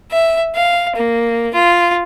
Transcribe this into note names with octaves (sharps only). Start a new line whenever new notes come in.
E5
F5
A#3
F4